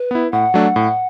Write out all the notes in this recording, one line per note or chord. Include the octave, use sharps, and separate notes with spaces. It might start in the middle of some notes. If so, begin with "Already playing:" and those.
Already playing: B4
B3 E4
A2 F#5
F#3 A3 D4
A2